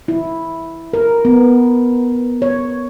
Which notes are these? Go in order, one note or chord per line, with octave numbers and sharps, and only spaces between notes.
E4
A#4
B3
C#5